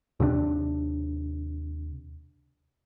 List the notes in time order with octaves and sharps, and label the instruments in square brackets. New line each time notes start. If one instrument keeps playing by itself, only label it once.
[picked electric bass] D#2 C3 C4 D4